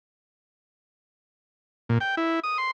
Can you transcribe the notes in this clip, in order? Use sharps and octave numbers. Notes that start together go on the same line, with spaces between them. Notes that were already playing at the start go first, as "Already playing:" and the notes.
A#2
G5
E4
D#6
C6